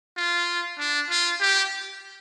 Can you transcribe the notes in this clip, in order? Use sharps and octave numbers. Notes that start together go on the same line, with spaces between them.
F4
D4
F4
G4